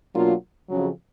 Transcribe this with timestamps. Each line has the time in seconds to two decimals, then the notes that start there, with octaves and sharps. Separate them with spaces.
0.15 B2 F#3 A#3 D4 F4
0.69 F2 C#3 F#3